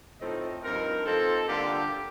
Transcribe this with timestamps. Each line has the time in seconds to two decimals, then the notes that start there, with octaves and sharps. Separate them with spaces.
0.20 A2 F3 A3 C4 D#4 D#5
0.63 G2 F3 C4 D#4 A#4
1.05 F3 C4 D#4 A4
1.48 D3 G3 A#3 D4 F4 G4